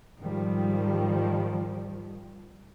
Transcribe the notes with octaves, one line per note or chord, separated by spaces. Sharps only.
G#2 D#3 F3 G3